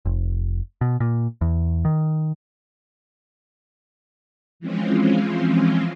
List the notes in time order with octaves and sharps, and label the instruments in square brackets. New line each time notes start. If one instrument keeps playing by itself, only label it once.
[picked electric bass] F1
B2
A#2
E2
D#3
[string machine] E3 F3 G#3 C4 C#4 F4